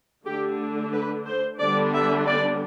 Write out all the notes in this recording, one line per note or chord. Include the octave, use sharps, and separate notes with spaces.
D3 A3 D4 G4
B4
C5
D3 G3 B3 D4 D5
E5
D5